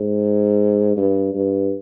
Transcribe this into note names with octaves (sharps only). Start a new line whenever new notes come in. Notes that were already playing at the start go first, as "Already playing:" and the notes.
Already playing: G#2
G2
G2